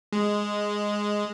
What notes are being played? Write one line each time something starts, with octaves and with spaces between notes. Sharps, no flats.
G#3